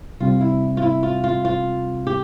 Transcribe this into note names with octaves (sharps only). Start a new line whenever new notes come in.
C3 G3 C4 F4
E4
F4
E4
F4
F4
F4
G4